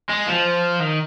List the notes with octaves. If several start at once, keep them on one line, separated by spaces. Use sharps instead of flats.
G#3
F3
D#3